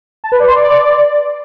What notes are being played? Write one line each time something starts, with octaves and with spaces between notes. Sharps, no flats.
A5
B4
D5
C6
D5